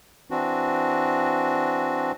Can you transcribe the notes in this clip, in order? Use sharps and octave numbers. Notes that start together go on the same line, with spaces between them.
E3 C4 D4 F#4